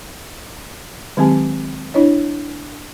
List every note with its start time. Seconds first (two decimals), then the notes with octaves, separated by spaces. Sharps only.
1.17 D#3 F#3 G#3 C4 G4 G#5
1.94 D4 E4 C#5 D#5